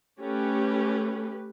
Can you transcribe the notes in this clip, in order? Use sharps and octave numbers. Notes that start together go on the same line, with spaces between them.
A3 C#4 G4 B4